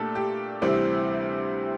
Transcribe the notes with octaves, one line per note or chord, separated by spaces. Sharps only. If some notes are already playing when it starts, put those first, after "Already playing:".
Already playing: A#2 A3 D4 G4 A4
G4
D2 C3 E3 G3 C4